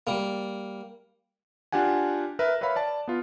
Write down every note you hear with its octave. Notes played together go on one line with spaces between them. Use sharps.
G3 A#3
D4 F4 G4 F#5 G#5
A#4 B4 E5
B4 C#5 E5 F5 B5
D5 A5
B3 F4